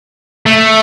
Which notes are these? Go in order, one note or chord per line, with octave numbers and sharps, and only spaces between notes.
A3